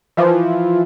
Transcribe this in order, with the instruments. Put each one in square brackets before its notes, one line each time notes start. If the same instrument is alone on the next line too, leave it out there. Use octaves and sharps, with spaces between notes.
[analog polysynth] E3 F3